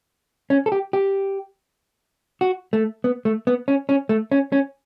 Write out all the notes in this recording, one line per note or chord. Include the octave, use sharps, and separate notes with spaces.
C#4
A4
G4
G4
F#4
A3
B3
A3
B3
C#4
C#4
A3
C#4
C#4